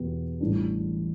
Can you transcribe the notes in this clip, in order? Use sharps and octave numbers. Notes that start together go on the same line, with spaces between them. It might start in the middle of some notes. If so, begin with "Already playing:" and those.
Already playing: E2 B2 B3 G4
A1 A2 G3 D4